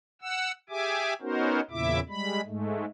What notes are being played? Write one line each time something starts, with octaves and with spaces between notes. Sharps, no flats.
F#5 E6
G4 G#4 E5 G#5 D6
B3 C#4 D#4 F#4 A#4 C5
E2 A#2 C#3 E4 E5 D6
G3 G#3 B5
G#2 G#3 A3